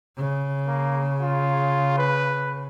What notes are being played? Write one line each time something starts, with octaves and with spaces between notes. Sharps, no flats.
C#3
A#3
F4
B4